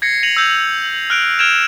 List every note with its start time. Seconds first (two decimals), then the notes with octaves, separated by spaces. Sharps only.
0.02 G#6 A#6 C7 C#7
0.23 A#6 C#7 D#7 F7 F#7
0.37 E6 G6 G#6 F7
1.10 F6 F#6 D7 F7
1.39 F6 G#6 D7 E7 F7